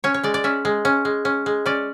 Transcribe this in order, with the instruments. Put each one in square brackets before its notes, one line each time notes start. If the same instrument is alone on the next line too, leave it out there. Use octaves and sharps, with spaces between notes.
[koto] C#4 C#5
C#5
G#3 D5
D5
C#4 E5
G#3
C#4
G#3
C#4
G#3
C#4 D5